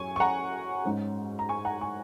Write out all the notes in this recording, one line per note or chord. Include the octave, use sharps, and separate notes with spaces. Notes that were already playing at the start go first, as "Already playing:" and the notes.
Already playing: F#2 F#3 C#4 G#5 C#6
C#6
F#5 A#5
G#2 G#3 C#4
A#5
G#5 C#6
F#5 A#5
G#5 C#6